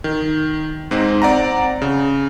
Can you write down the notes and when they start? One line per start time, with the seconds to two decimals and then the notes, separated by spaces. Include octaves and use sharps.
0.04 D#3
0.91 G#2 C4 D#4
1.22 C4 D5 F#5 A#5
1.82 C#3